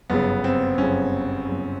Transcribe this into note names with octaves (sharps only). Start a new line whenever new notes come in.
G1 F#2 C#3 B3
C4
G1 F#2 C#3 C#4
G1 F#2 C#3